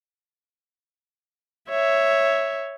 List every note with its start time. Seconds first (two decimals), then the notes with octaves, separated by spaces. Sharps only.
1.70 C#5 E5